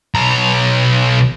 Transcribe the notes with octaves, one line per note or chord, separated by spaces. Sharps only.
B1 A#5